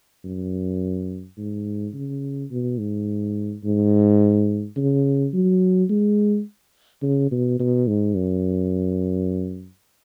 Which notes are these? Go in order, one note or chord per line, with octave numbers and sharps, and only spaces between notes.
F#2
G#2
C#3
B2
G#2
G#2
C#3
F#3
G#3
C#3
B2
B2
G#2
F#2